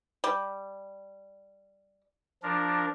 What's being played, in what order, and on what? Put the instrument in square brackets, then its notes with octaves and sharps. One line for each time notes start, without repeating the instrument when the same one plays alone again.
[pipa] G3
[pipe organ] F3 D4 A#4